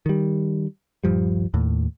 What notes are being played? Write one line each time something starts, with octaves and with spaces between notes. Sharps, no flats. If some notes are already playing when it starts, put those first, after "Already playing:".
D#3 G3
D#1 G2 F3 G3
D#2 A2